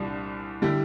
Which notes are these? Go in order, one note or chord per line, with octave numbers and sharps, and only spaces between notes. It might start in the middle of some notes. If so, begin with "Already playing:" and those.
Already playing: C2 A#2 G3 D4
D3 G3 E4 G4